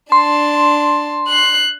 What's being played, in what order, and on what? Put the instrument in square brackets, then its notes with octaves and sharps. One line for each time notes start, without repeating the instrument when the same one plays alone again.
[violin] D4 A5 [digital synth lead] C6
[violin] F#6 C7